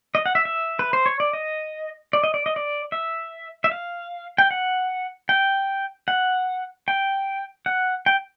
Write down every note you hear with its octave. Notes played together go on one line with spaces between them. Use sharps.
D#5
F#5
E5
E5
B4
C5
C#5
D5
D#5
D5
D#5
D5
D#5
D5
E5
E5
F5
G5
F#5
G5
F#5
G5
F#5
G5